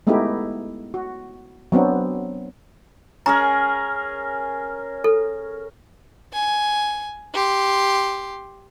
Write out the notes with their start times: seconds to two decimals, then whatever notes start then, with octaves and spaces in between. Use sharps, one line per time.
0.07 G#3 A3 B3 D#4 E4 G4
0.94 F#4
1.72 F#3 B3 C4 D4
3.26 C#4 G#4 A#4 A#5
5.04 A4
6.33 G#5
7.34 G4 C6